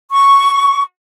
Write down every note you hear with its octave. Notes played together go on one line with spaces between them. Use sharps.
C#6